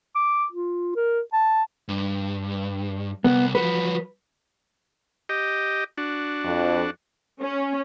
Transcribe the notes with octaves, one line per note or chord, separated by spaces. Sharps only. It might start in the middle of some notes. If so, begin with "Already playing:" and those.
D6
F4
A#4
A5
G2
C2 B3
F3 F#3 B4
G4 D#5
D4 F#4
F2
C#4